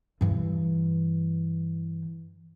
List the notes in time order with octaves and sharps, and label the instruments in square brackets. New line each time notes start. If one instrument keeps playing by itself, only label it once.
[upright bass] G2 E3